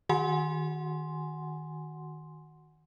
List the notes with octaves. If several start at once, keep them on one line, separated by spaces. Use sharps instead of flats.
D#3 F#4 F#5 G#5 C6